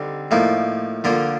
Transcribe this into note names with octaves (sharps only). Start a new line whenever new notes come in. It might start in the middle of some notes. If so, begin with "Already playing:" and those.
Already playing: D3 G3 C4 D#4
A2 F3 A#3 D#4
D3 F3 A#3 D4 F4